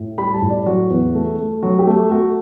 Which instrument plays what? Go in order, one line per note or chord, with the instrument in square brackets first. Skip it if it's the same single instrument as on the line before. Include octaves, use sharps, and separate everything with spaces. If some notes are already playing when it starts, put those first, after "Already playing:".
Already playing: [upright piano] A2
G3 B5
A5
A2
D5
F#3 F#4
E2
A3
A3
F#3 F#4
G4
A3
A3 F#4